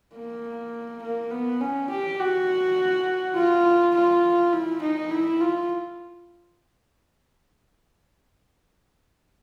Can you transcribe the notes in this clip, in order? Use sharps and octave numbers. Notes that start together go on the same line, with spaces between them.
A#3
A#3
B3
C#4
G4
F#4
F4
F4
E4
D#4
E4
F4